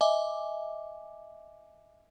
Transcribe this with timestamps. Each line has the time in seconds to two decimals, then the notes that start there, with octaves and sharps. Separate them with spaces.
0.01 D#5 E5 G#5 D6